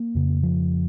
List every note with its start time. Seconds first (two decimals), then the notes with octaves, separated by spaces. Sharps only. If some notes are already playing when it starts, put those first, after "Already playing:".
Already playing: A#3
0.15 F2 C#3
0.43 F3